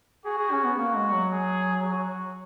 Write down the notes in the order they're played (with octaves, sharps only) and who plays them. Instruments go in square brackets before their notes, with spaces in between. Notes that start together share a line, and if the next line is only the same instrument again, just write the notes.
[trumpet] F#4 [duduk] G#4
[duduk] G#4
C#4
B3
[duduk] A#3 [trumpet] F#4
[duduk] G#3
F#3
[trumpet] G#4
F#4